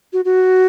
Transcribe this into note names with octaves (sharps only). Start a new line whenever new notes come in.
F#4
F#4